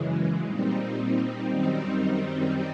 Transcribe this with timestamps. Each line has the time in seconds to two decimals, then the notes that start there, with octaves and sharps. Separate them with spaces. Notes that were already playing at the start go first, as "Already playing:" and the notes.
Already playing: F#2 C#3 E3 G#3
0.43 A#2 G3 C4 D#4
1.49 F#2 D#3 G3 C4 D#4